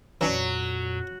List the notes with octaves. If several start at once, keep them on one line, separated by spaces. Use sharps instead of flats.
F2 A#2 E3 F#3 C#4 D4